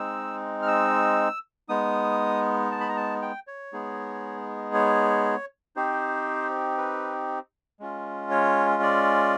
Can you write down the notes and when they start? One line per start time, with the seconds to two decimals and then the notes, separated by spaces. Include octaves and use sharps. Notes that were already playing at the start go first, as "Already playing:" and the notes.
Already playing: G#3 C4 D#4 E6
0.62 F6
0.67 E6
1.69 G#3 B3 D#4 D#6
2.71 A5
2.80 B5
2.89 A#5
2.97 A5
3.22 G5
3.47 C#5
3.73 G#3 B3 D#4 G#4
4.74 C#5
5.76 C4 D#4 G4 C5
6.78 B4
7.80 G#3 C#4 F4
8.31 C#5
8.82 D5